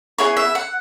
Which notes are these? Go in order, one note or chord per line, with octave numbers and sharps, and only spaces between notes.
B3 E4 G#4 C#5
E5
F#5